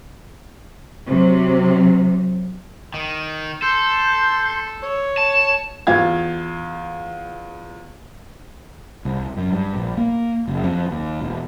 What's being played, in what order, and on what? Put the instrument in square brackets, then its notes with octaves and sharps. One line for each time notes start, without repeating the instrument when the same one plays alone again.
[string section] C3 F#3
[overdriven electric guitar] D#3
[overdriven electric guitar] A4 [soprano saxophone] C6 [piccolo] G6
[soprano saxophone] C#5
[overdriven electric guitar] A5 [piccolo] E7
[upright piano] E2 F4 F5 G#6
[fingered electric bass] C2
F#2
G2
A#1
A#3
F#1
F2
D#2
E1